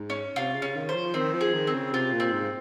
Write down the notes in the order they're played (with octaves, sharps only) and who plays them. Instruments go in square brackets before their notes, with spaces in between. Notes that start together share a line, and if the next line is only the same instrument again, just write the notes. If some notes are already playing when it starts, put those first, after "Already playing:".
Already playing: [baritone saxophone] G#2
[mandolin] C#4
[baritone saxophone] C3 [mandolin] F4
[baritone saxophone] C#3
[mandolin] C#4
[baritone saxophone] D#3
[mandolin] C5
[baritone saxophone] F3
[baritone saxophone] D#3 [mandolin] C4
[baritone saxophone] F3
[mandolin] G#4
[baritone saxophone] D#3
[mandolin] C4
[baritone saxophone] C#3
[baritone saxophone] C3 [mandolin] F4
[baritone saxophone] A#2
[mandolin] C4
[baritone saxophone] G#2